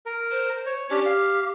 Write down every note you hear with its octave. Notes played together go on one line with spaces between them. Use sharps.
A#4
C5
C#5
C#4 D4 G4
F5